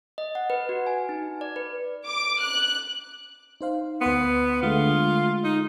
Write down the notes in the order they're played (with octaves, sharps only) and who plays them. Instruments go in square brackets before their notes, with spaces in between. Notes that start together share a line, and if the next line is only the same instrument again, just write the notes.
[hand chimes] D#5
F#5
B4
F#4
G#5
D#4
D5
B4
[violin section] D6
F#6
[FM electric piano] D#4 C5 F5
[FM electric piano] D2 B4 C6 [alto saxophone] B3
[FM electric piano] D3 G#3 A3 [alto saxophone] F4
[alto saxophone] D#4